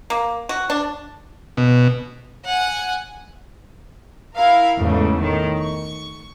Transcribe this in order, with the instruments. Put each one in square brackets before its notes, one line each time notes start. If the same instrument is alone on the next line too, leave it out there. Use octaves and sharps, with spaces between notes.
[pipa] A#3
F#4
D4
[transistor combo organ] B2
[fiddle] F#5 G#5
[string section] E4 A#4 F5
E2 G#2 C#3 A3
A2 D#3
C#6